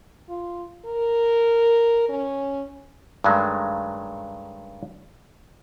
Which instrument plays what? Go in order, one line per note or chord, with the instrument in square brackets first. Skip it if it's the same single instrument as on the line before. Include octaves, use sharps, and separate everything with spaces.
[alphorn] F4
A#4
C#4
[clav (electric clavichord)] G2 D#3 F#3 G#3 A3